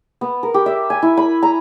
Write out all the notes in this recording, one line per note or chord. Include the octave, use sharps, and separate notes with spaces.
B3
A#4
G4
E5
G#5
E4
B5
A#5